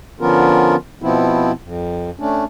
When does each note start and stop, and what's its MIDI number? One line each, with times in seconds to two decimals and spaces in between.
0.20 0.76 50
0.20 0.76 53
0.20 0.76 59
0.20 0.76 61
0.20 0.76 65
0.20 0.76 70
1.02 1.52 47
1.02 1.52 53
1.02 1.52 59
1.02 1.52 60
1.02 1.52 64
1.63 2.10 41
2.20 2.45 57
2.20 2.45 61
2.20 2.45 62